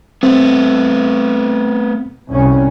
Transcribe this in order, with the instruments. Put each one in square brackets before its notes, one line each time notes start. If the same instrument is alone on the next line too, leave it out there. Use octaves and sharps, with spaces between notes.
[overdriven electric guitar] A3 B3 [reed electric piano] C4
[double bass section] C2 C#4